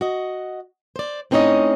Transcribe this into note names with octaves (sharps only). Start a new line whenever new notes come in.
F#4 D#5
C5 D5
A2 C4 C#4 D#4 C#5 D#5